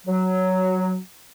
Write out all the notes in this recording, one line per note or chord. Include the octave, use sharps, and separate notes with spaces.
F#3